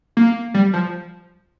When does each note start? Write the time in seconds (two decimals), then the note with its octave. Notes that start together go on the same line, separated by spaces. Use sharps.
0.17 A#3
0.54 G3
0.73 F3